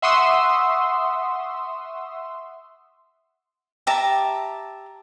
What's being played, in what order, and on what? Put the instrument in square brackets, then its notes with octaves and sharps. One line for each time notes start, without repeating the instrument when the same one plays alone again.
[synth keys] E5 F#5 C6 C#6 D#6 E6
[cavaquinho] G4 E5 A5 A#5